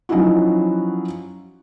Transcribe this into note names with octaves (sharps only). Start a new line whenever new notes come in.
F3 F#3 C#4 D#4 E4 F#4